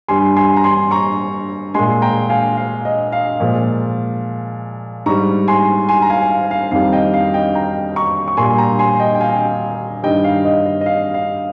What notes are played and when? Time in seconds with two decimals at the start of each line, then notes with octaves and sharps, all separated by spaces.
0.08 G2 G3 G#5 C6
0.36 G#5 C6
0.57 A#5
0.64 G#5 C6
0.91 A#5 C#6
1.74 A#2 G#3 G#5 C6
2.02 G5 A#5
2.29 F5 G#5
2.57 F5
2.85 D#5
3.12 F5
3.40 A#2 F3 G#3
5.06 G#2 G3 A#5 C#6
5.48 G#5 C6
5.88 G#5 C6
6.02 A#5
6.10 F5 G#5
6.31 F5
6.51 F5
6.71 F2 D#3 G3 F5
6.93 D#5 G5
7.14 F5
7.34 D#5 G5
7.55 G5 A#5
7.96 A#5 C#6
8.28 C#6
8.37 A#2 G3 G#5 C6
8.58 G5 A#5
8.79 G#5 C6
9.00 D#5 G5
9.15 G5
9.20 F5 G#5
10.03 G2 D#3 G3 D#5 G5
10.24 F5
10.45 D#5
10.66 D#5
10.81 D#5
10.86 F5
11.14 F5